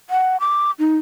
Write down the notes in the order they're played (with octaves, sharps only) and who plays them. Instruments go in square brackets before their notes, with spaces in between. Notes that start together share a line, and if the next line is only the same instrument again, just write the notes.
[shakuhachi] F#5
D6
D#4